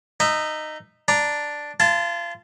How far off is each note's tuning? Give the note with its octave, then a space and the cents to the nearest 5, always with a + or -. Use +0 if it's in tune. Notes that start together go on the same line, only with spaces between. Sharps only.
D#4 -15 E5 +0
D4 +0 A#5 +0
F4 -30 A5 +0